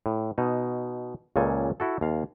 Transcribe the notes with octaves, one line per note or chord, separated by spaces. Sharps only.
A2
B2 D#4
C#2 A#2 C#3 A4 G#5
E4 F#4 A4
D#2 F5